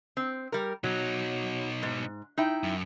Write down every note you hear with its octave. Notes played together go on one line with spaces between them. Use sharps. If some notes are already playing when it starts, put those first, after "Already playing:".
C4
G3 A#4
B2 F#3 D#4
G#2
D#4 E4 G5
F#2